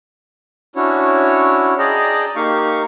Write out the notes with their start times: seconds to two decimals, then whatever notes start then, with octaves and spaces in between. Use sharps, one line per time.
0.76 C#4 D4 E4 F#4 C#5
1.79 G#4 D5 D#5 G5 A5 A#5
2.36 A#3 D#4 G4 F5 C#6